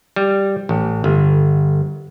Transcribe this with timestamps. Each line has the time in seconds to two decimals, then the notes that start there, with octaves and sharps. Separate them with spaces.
0.16 G3
0.69 A1
1.04 G1